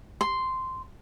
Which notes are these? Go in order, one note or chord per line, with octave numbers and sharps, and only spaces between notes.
C6